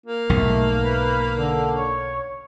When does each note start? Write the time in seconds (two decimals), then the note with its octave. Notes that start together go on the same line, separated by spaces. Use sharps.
0.06 A#3
0.30 B1 G#2 A3
0.81 B4
1.34 D3
1.76 C#5